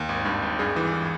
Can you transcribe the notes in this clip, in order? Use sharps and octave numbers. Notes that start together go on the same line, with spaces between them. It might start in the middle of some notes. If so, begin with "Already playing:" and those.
Already playing: D#2
G#1
G2
G#1
G2 G#4
E3